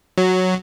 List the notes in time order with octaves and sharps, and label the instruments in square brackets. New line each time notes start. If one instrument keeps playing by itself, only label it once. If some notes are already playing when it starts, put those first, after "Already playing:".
[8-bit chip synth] F#3